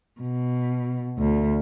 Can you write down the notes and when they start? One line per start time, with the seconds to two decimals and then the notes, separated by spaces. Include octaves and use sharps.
0.21 B2
1.19 D2